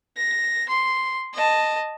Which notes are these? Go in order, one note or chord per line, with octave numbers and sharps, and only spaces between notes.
A#6
C6
D#5 A5